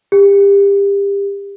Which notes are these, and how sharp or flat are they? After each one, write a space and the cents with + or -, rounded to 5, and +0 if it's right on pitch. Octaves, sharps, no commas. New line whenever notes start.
G4 +30